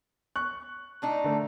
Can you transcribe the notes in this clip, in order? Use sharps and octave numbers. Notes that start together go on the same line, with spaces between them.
C#6 F#6
A2 D4 D#4
D3 A3